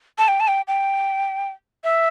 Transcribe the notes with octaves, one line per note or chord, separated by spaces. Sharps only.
A5
G5
A5
G5
G5
E5